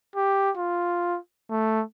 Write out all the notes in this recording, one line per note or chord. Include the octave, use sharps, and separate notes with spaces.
G4
F4
A3